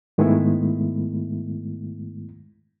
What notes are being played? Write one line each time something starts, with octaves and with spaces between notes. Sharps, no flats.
G#2 D#3 G#3 A3 B3 E4